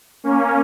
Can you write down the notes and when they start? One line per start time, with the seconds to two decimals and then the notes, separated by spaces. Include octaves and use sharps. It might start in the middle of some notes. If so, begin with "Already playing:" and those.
0.24 A#3 C#4